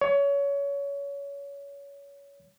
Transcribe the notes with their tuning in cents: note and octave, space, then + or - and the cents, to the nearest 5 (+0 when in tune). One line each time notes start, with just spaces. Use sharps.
C#5 +25